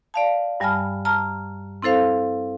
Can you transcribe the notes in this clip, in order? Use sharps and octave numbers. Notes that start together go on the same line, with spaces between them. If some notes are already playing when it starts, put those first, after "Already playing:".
D5 F5 A5
G2 G3 G#5 A5 B5 F6
A5 A#5 F6
C4 E4 A4 C5 F5